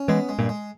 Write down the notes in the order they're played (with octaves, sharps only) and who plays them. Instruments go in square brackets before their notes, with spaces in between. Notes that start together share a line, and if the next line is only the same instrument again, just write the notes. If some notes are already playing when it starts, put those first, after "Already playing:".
Already playing: [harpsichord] C#4
[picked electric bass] E3 G#3 [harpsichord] B3
[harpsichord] G#3
[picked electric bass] G2 A#2
[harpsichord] G#3